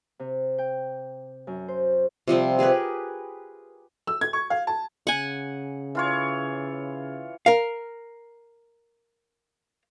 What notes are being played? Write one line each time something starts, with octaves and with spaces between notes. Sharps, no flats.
C3
G5
F#2
C5
C3 F3 G3 C4
G4 G#4 A#4 B4
E6
G#6
C#6
F5
A5
C#3 F#5 G#5
E3 F4 C#5
A#4 F5